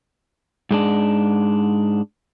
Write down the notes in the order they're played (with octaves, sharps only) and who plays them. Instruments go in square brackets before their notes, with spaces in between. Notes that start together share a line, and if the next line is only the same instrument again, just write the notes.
[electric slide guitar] G#2 G#3 D4